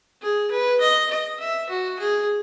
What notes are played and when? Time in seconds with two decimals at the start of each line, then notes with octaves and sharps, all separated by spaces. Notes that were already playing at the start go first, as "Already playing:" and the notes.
0.22 G#4
0.51 B4
0.81 D#5
1.11 D#5
1.40 E5
1.70 F#4
1.99 G#4